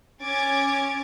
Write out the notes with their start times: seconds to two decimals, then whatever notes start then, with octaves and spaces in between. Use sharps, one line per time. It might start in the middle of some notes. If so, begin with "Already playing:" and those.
0.23 C#4 D6 G#6 A6